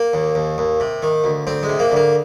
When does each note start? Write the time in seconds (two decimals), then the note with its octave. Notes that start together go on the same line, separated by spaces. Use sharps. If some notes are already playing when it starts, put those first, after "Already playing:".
Already playing: A#3
0.13 D#2
0.35 D#2
0.58 D#2
0.80 C3
1.03 D#3
1.24 D2
1.47 D2 C4
1.63 G#3
1.69 C3
1.79 A#3
1.91 D2
1.96 A#3